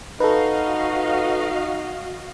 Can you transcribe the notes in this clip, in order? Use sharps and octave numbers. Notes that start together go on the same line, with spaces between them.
D#4 F#4 A4 B4 D#5 F5